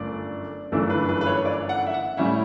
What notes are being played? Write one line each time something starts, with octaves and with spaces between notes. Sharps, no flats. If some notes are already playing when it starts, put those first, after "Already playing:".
Already playing: G1 F#2 A3 D5
G1 F#2 E3 A3 D4 A4
B4
B4
B4
C#5
D5
F#5
E5
F#5
A2 G3 C#4 E4 E5